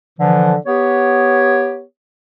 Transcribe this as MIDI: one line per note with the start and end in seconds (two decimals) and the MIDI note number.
0.19 0.55 50
0.19 0.55 52
0.19 0.55 53
0.66 1.83 59
0.66 1.83 67
0.66 1.83 73